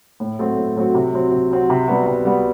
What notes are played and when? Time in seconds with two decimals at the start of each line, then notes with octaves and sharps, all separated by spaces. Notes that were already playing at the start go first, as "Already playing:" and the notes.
0.20 A2
0.39 F#3 A3 C4 F#4
0.57 A2
0.77 F#3 A3 C4 F#4
0.95 C3
1.14 F#3 C4 F#4
1.32 C3
1.51 F#3 C4 F#4
1.70 C3
1.88 G3 B3 F#4
2.06 C3
2.25 G3 B3 F#4